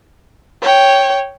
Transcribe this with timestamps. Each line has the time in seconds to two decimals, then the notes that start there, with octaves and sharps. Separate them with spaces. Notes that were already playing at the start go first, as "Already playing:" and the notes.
0.62 C#5 G5